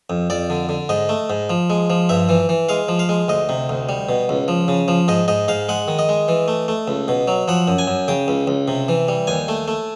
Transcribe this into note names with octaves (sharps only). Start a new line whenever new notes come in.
F2
F2 D5
D3
D3
G#2 D#5
A3
G#2
F3
G#3
F3
G2 E5
E3
E3
G#3 F5
F3
F5
G#3
D2 D#5
C3
D2
G3
B2
C#2
F3
C#3
F3
G#2 D#5
G#2 D#5
G#2 F5
G#3 F#5
D#3
D#5
G#3
E3
A3
A3
C#2
B2
F#3
F3 F#5
F#2
G#5
F#2
C#3 G5
C#2
C#2
C3
E3
G3
D#2 G#5
A3
A3